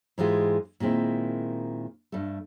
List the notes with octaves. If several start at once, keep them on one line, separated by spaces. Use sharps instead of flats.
G#2 E3 G#3 F4 G4
A#2 D#3 G#3 C4 E4
G2 A3